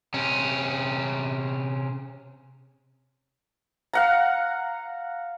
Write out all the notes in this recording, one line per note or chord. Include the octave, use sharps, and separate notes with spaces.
C3 C#4
F5 F#5 A#5